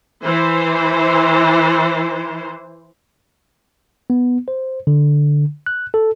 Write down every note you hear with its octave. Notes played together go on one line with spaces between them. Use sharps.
E3 C5
B3
C5
D3
F#6
A4